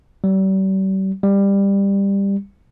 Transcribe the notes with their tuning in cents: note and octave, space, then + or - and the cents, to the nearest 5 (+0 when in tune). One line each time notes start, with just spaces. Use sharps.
G3 -40
G3 +15